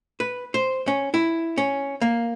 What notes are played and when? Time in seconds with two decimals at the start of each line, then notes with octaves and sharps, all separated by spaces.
0.20 B4
0.54 C5
0.88 C#4
1.14 E4
1.58 C#4
2.01 A#3